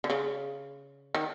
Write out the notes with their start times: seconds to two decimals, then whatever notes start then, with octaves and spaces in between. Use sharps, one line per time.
0.04 D3
0.10 C#3
1.14 D#3